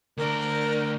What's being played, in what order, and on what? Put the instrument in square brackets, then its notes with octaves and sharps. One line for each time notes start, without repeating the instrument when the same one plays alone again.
[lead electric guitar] D2 D4 [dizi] A#4